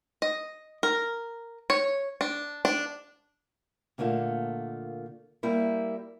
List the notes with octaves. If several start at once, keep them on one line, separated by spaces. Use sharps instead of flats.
D#5
A#4
C#5
D4
D4
A#2 D3 A3 A#3 F4
G3 A#3 E4 G4